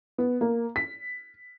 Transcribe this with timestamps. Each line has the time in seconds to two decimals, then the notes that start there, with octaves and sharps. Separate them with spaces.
0.18 B3
0.41 A#3
0.76 B6